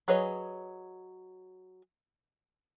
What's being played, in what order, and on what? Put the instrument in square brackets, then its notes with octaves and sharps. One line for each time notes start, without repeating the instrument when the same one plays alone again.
[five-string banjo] F#3 G#4 B4 C#5 D#5